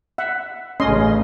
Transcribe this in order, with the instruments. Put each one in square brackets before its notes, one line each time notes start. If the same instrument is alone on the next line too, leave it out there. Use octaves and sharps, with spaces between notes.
[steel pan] E5 F#5
[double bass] A1 C#3 [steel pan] C#4 D#5 C6